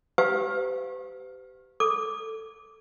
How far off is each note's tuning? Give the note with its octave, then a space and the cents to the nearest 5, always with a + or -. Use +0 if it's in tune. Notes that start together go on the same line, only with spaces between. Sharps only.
G4 -15 B4 +45 F5 -5
A4 +5 D6 -5